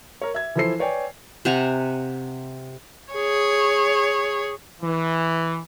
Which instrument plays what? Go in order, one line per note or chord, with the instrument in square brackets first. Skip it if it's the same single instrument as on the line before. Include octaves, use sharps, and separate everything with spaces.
[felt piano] A#4 C#5
E5 G#6
E3 F3 E4 A4 C5 C7
B4 C#5 D5 G5 G#5
[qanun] C3 F#5 G#5 A#5
[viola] G#4 C#5
[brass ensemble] E3